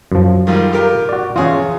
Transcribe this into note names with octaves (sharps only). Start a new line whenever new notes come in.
F#2 F3
D#3 G3 F4
F4 G4 A#4
F#4 D5
E2 C#4 F4 G#4